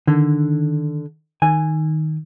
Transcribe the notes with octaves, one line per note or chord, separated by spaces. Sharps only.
D3 D#3
D#3 G#5